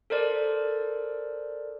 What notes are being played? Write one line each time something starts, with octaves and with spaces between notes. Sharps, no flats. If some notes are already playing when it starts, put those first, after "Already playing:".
A4 A#4 C5 D5